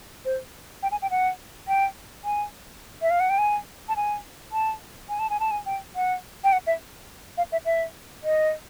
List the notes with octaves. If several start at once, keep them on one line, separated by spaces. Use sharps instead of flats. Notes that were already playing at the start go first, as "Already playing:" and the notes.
C5
G5
G#5
G5
F#5
G5
G#5
E5
F5
F#5
G5
G#5
A5
G#5
A5
G#5
A5
G#5
A5
G#5
G5
F#5
G5
F#5
E5
F5
E5
E5
D#5